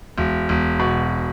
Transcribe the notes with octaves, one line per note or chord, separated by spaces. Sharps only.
E1
E1
B2